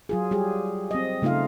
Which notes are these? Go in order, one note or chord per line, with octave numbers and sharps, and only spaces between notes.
F#3 F4 G#4
G3 G4 G#4
C4 D#5
C#3 A3 D#4 F4 F5